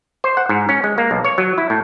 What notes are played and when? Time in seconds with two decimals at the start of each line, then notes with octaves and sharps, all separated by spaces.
0.24 C5
0.37 F#5
0.49 G#2
0.69 C#4
0.84 G#3
0.98 A#3
1.11 B1
1.24 C#5
1.38 F#3
1.58 E4
1.70 A2